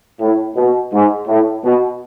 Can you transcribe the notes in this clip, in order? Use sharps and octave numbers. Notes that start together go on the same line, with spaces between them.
A2
B2
G#2
A2
B2